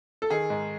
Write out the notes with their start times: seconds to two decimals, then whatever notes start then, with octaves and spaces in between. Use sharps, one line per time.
0.22 A4
0.30 D#3 G#4
0.50 G#2